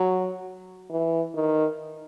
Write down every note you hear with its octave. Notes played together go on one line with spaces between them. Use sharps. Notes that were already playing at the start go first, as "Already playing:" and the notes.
Already playing: F#3
E3
D#3